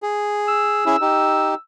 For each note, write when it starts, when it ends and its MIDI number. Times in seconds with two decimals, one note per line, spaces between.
0.03 0.85 68
0.48 1.58 88
0.86 0.96 61
0.86 0.96 64
0.86 0.96 68
1.01 1.55 63
1.01 1.55 67